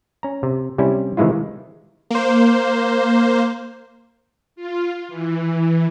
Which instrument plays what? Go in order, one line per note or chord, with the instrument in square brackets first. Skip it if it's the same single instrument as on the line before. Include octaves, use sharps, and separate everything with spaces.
[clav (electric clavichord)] C#4 A#5
C3
C3 G3 C#4 E4
C3 D#3 E3 G#3 E4 F4
[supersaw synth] A#3 C5
[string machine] F4
E3